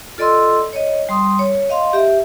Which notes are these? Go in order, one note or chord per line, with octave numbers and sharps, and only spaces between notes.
F4 A4 D5 D#5 C6 E6
C#5 D#5
G3 C6 D#6
C#5
D#5 F5 C6
G4 E5